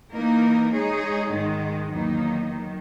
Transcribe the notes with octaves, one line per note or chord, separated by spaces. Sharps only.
E3 A#3 D#4 A#4
G#3 D#4 G#4 C#5
G#2 D#3 G#3
E2 D#3 F#3 A#3 D#4
D#3 F#3